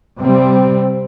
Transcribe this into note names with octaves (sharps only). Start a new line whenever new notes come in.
C3 G3 C4